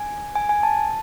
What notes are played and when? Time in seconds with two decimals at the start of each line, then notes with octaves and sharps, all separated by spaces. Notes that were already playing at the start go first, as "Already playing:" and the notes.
Already playing: G#5
0.35 G#5
0.49 G#5
0.63 A5